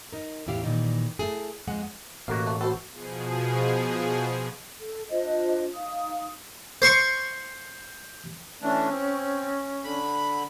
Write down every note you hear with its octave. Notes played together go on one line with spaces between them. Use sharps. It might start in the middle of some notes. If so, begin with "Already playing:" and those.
D#4 A#4
E2 A2 E4 G4 F5
A#2 D#3 E3 G3 D#4
A3 E4 G#4
F2 G#3 F#5
A1 B2 A#3 F#4 F5
A3
B3 F#4 A4 C5
B2 F3 G#4
A4
D4 F4 C5 D#5
D#4 F5 D#6
C5 C6 C#6
E3 A3 C#4 D4
C4
D3 B5